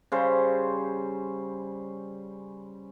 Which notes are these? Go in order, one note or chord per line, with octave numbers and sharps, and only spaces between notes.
C#3 G3 C5